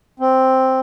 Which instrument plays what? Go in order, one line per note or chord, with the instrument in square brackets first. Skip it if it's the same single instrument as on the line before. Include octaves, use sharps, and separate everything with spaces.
[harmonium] C4